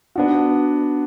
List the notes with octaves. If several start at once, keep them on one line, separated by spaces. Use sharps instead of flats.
B3 D4 F#4